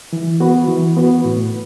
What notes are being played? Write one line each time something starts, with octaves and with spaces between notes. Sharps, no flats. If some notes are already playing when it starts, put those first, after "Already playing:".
E3
B3 F#4 B4
E3
B3 F#4 B4
A2